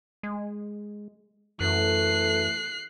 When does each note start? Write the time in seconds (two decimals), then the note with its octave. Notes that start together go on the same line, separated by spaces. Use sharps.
0.23 G#3
1.60 F#2 E3 A3 A4 F#6 C7